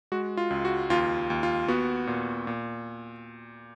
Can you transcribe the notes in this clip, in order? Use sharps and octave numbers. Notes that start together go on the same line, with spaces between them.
G#3 F#4
F4
C#2
F#4
D#2 F4
D#2
F4
B3 F#4
A#2
A#2